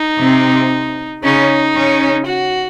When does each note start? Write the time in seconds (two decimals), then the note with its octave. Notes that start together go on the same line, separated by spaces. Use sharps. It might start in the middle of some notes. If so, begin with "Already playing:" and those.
Already playing: D#4
0.21 C3 C4
1.24 C#3 C#4 D#4
1.75 C#3 C#4
2.27 F#4